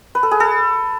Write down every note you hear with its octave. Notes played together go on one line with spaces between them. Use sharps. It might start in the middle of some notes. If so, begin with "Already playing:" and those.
B4
A4
G#4
A4